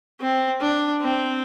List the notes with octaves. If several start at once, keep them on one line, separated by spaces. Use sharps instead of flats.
C4
D4
C4